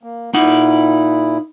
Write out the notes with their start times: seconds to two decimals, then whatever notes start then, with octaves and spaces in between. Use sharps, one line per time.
0.03 A#3
0.34 A#2 D#4 E4 F#5